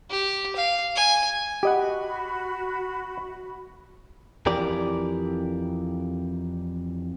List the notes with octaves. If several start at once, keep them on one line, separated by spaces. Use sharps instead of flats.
G4
F5
G#5
F#4 G4 D#5 F#5 B5
F2 E3 G4 A#4 D5